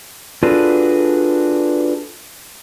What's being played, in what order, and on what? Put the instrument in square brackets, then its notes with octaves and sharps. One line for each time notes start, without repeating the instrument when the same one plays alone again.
[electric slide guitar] D4 F4 F#4 G#4 A4 B4